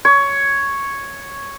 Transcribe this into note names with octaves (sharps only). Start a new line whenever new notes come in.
C#5